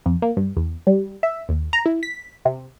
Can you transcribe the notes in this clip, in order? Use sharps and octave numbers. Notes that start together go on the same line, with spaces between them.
F2
A#3
G2
E2
G3
E5
D#2
A#5
E4
B6
C3